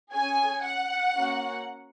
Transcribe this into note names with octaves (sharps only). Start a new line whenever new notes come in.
C#4 G#4 G#5
F#5
A#3 C#4 F#4